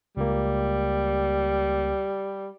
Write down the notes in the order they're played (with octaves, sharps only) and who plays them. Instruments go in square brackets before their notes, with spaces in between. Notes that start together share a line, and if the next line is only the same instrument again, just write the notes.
[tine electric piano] C#2 A#3 [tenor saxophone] G3